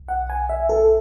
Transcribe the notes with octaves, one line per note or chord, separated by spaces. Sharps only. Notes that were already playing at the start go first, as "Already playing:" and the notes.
Already playing: B1
F#5
G#5
E5
A4